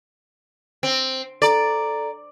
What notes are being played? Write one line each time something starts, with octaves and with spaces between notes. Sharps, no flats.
C4
A4 D5 A#5